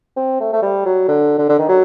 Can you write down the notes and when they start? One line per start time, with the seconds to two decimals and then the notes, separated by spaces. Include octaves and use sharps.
0.16 C4
0.40 A3
0.53 A3
0.62 G3
0.85 F#3
1.08 D3
1.38 D3
1.49 D3
1.59 D#3
1.69 F#3